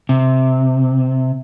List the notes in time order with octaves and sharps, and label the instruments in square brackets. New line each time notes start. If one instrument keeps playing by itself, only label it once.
[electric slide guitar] C3